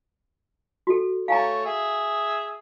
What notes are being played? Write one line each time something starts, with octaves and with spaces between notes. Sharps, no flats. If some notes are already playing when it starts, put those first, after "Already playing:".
F#4 A4
A3 C#5 F5 G#5 A#5
G#4 E5